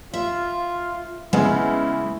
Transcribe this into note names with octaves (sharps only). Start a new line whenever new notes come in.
F4 E5
C#3 G#3 B3 E4